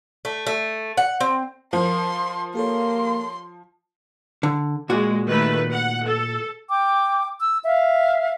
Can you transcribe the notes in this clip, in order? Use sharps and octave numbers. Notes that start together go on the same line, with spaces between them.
A3
A3
F#5
C4
F3 A#4 C5 C6
A#3 G4 A4 C#5 C6
D3
A#2 G#3 F#4
D#3 A3 B4
F#5
A4
G5 D6
E6
E5 F5